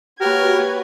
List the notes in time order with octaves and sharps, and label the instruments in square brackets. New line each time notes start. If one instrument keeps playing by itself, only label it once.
[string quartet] A#3 C#5 G#6 [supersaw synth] F#4 B4 [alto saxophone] G4 [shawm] A#4